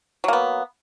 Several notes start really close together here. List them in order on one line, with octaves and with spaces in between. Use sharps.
F#3 A#3 B3